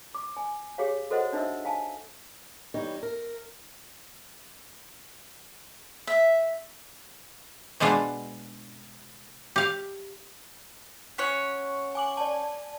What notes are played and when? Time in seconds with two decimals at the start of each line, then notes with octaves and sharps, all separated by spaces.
0.15 D6
0.37 G#5
0.78 G4 G#4 C#5 F5
1.11 F#4 A4 C5 D#5 F#5
1.33 D4 D#4 C5 D#5 E5 E6
1.65 F5 G#5 A5
2.74 E3 G3 D#4 C#5
3.03 A#4
6.07 E5
7.80 B2 G#3 B3 D4 F4
9.56 G4 F5
11.18 C#4 C#5 F#5
11.95 G#5 D6 F#7
12.17 D5 A5